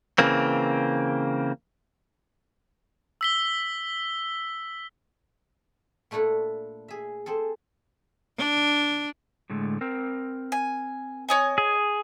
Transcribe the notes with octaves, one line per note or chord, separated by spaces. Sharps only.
C#3 E3 A#3 C4
E6 B6 G7
A#2 A3 D4 E4 A4
G#4 E5
C4 G#4 A4
D4
A2 D3 G#3
C4 A#4
G#5
C#5 D#5 G#5
G#4